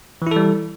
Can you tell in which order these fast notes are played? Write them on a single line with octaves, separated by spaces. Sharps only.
E3 E4 A4 G3